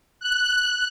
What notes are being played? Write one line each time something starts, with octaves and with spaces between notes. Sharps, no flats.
F#6